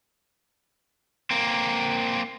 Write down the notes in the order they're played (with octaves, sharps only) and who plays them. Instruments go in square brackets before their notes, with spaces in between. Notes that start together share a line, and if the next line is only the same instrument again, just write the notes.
[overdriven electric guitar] A#3 C4